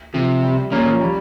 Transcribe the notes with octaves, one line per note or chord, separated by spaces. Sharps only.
C3 F3
G3
A#2 A#3 C#4
F3
G3